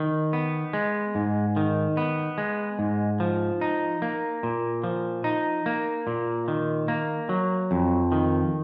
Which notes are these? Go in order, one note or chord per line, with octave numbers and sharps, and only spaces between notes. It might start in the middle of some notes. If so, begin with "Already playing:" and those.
Already playing: D#3
B3
G#3
G#2
D#3
B3
G#3
G#2
F3
D#4
A#3
A#2
F3
D#4
A#3
A#2
D#3
A#3
F#3
F2
D#3